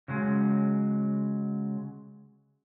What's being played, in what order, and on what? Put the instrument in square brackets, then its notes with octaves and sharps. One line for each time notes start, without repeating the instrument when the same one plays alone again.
[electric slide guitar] C#3 F#3 G#3